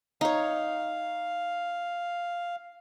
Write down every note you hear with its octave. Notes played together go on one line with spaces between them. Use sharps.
D#4 C#5 F5